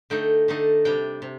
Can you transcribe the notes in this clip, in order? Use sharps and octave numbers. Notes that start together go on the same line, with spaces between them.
D3 A3 D#4 G5
D3 A3 D#4
C3 G3 D4 G5
C3